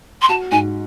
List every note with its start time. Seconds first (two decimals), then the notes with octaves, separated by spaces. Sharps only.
0.22 C6
0.28 F#4 A5
0.51 G#2 G#5